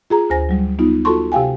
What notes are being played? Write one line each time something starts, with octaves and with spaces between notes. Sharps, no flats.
F4 G#4 A#5
D2 C5 G#5 A#6
F#3 G3
B3 D#4 F4
F4 F#4 A4 A5 C6 C#6
C3 G4 F5 G5 G#5